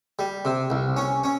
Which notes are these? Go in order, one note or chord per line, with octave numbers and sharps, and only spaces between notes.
G3
C3
C2
C#4
C#4